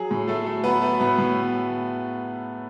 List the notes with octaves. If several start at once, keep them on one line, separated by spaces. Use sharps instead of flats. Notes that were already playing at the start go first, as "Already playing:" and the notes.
Already playing: F#3 G#4
A2
F#3 A3 A4
A3
F#3 B3 B4
A3
A2 B3 B4
A2